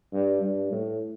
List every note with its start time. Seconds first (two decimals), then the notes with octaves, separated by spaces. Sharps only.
0.13 G2
0.42 G2
0.72 A2